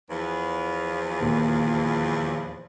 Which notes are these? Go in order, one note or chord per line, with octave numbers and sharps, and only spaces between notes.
E2 F3
D#2 A#2